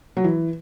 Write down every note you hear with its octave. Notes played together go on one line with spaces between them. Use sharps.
F#3
E3